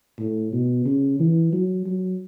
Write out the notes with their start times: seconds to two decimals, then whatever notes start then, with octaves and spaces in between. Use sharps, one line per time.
0.19 A2
0.52 B2
0.85 C#3
1.19 E3
1.53 F#3
1.86 F#3